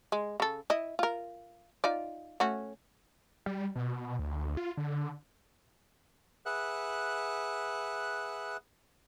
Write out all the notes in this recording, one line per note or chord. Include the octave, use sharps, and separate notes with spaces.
G#3
C#3 A4
E4 D#5
F4 A#4
D#4 F4 D5
A3 C#4 F#4
G3
B2
D2
F4
D3
G#4 B4 E5 F#5 F#6